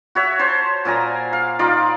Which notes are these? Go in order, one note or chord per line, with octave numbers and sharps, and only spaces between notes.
F#4 C#5 E5
C5 C#5 A5
A#2 D5 G#5 A#5
F5
D#4 F4 D5 D6